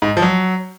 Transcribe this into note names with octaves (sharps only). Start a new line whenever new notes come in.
G#2
F3
F#3